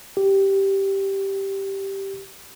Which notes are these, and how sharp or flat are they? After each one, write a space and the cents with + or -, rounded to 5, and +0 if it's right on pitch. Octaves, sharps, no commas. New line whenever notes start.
G4 -5